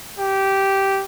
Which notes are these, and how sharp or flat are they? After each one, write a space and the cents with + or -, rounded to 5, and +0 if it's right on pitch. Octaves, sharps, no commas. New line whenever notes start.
G4 -10